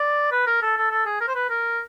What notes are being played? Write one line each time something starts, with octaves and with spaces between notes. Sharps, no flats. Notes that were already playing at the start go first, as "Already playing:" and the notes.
Already playing: D5
B4
A#4
A4
A4
A4
G#4
A#4
C5
B4
A#4